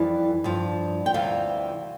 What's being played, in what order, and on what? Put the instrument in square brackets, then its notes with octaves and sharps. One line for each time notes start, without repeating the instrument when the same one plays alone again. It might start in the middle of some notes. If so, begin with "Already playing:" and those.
Already playing: [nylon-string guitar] F2 E3 G3
G2 F3
G5
D2 C3 E3 G3 F5